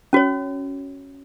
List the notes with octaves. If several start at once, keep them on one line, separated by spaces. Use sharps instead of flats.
C#4 F#4 C#5